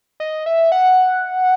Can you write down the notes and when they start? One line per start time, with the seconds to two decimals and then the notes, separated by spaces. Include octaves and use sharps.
0.20 D#5
0.46 E5
0.72 F#5